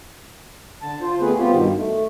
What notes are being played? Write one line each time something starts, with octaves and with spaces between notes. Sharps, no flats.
D3 A5
F4 C5
D3 A3 B3 C4 G#4 B4
G3 B3 C4 F4 G4
G2 B2 D#3
A3